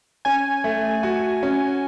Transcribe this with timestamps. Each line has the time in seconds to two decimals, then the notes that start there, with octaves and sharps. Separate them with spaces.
0.25 C#4 G#5
0.64 A3
1.03 F#4
1.43 C#4